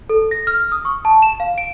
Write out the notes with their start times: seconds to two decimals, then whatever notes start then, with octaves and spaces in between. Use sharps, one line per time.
0.09 A4
0.31 A#6
0.47 F6
0.72 D#6
0.85 C#6
1.05 A5
1.22 E7
1.40 F5
1.58 D7